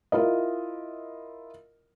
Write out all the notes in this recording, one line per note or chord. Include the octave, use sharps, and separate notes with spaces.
E4 F4 A#4 D#5